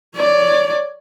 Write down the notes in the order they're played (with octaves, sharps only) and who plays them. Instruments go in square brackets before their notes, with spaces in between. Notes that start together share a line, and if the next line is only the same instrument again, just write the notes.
[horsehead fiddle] C#5 D5